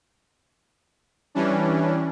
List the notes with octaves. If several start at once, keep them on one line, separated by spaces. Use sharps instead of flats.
E3 G3 C#4 D4